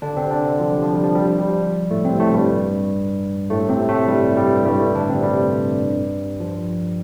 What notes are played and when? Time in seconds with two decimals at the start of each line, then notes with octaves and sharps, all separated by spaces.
0.02 D3 D4
0.17 C3 C4
0.31 D3 D4
0.45 D3
0.60 F3
0.72 G3
0.82 F3
0.93 G3
1.04 F3
1.15 G3
1.27 F3
1.38 G3
1.48 F3
1.91 A2 A3
2.05 C3 C4
2.20 A2 A3
2.34 G2 G3
3.50 A2 A3
3.69 C3 C4
3.89 A2 A3
4.08 G2 G3
4.37 G2 G3
4.66 G2 G3
4.80 A2 A3
4.95 D3 D4
5.09 C3 C4
5.23 G2 G3
6.40 F3